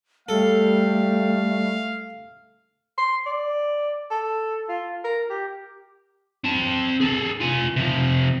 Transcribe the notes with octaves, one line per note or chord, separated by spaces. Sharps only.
G3 A3 A4 F5
C6
D5
A4
F4
A#4
G4
C4 A5
G#4 A4
F4 G#5
C3 F3